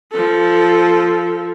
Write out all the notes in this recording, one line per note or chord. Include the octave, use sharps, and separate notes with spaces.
F3 A4